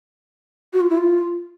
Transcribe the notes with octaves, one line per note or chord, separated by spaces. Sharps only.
F#4
F4
E4
F4